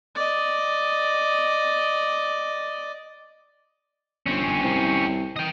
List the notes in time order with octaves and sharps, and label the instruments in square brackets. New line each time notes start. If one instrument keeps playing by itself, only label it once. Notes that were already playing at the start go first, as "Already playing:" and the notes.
[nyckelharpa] D5 D#5
[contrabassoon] G1 [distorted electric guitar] C4 C#4
[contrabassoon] C2
[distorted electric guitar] D#5 G5